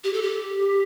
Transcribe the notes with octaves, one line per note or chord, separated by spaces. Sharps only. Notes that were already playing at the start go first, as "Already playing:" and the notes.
G4
A4
G4